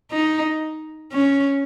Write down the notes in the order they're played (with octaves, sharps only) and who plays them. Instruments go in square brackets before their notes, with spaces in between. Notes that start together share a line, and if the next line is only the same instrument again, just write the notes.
[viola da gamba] D#4
C#4